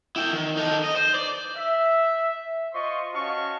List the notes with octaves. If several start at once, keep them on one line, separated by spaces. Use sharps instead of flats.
E4 G5
D#3
D#4 A4
D#5
C5
D5
E5
F4 C5 D#5 C6 C#6
C#4 F#4 D#5 F5 A5 C#6